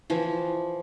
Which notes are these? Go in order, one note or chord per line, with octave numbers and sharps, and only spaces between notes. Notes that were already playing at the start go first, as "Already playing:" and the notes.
E3 F3